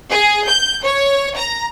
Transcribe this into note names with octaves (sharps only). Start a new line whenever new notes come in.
G#4
G6
C#5
A#5